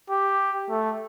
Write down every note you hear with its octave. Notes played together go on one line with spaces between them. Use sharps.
G4
A3